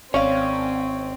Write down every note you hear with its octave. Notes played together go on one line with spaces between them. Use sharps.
G#1 C4 C#4 C#5 D5 F5